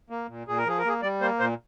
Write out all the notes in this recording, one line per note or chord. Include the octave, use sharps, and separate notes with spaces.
A#3
A#2
A#2 G#4
A#4
F3 G#4
A#4
A#3 G#4
G3 D5
A#3 C5
A#2 C5